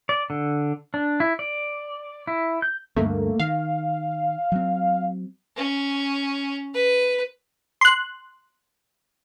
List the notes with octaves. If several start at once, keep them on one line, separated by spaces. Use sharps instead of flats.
D5
D3
D4
E4
D5
E4
G6
D2 G2 A3 A#3
D#3 F5
F#3 C4
C#4
B4
C6 F#6